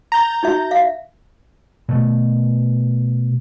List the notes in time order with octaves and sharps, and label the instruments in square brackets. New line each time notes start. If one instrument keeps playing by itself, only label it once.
[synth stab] A#5 G6 A6
[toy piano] D#4 F#4 E5
E5 F5
[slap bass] B2 A3